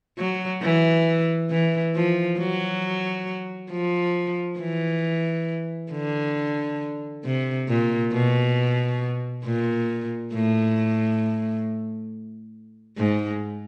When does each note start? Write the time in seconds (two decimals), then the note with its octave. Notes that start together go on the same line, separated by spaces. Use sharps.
0.18 F#3
0.63 E3
1.50 E3
1.95 F3
2.39 F#3
3.71 F3
4.59 E3
5.92 D3
7.25 C3
7.69 A#2
8.13 B2
9.45 A#2
10.34 A2
12.98 G#2